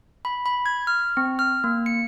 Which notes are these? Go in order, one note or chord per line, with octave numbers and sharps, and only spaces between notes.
B5
B5
G#6
F6
C4
F6
A#3
C#7